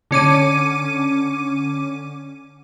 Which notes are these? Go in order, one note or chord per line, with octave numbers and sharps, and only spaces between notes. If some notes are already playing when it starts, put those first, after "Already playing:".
D3 C#4 D6 D#7